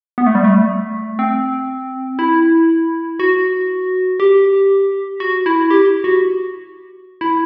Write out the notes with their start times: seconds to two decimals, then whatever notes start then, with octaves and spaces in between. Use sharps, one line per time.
0.18 B3
0.26 A3
0.35 G3
0.44 A3
1.19 C4
2.19 E4
3.20 F#4
4.20 G4
5.20 F#4
5.46 E4
5.71 G4
6.04 F#4
7.21 E4